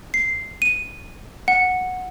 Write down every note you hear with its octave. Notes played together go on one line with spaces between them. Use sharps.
C7
D#7
F#5